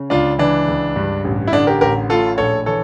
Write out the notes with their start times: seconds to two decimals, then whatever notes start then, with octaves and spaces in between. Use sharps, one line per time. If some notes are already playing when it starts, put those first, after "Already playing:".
Already playing: C#3
0.10 C#2 D4 F4
0.39 E3 D4
0.68 C#2
0.96 G2
1.25 A1
1.47 E4
1.52 D3 D4
1.67 G4 A#4
1.81 A1 G4 A#4
2.09 A2 F4 A4
2.38 A#1 A4 C#5
2.66 E3 A4 C#5